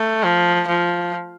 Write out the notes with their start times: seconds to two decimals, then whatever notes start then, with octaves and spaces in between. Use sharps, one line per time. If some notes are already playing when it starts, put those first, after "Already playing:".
Already playing: A3
0.24 F3
0.67 F3